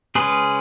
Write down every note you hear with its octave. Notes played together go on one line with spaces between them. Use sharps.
C#3 G#3 C#4 G#4 B4